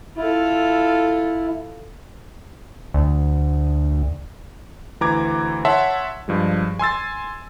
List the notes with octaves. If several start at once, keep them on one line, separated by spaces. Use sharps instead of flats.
E4 F4 A4
D2
D2 E3 A#5 D6 G#6
C#5 E5 F#5 A5 C6
G2 F3 G#3
G#5 C6 E6 A6